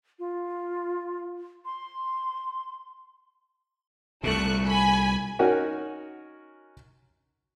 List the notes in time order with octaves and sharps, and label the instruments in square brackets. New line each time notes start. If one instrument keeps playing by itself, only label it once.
[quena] F4
C6
[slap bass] C2 A#2 [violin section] A3 C#6 F#6
[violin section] G#5 B5
[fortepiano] C#4 D#4 F#4 A#4 F#5 G#5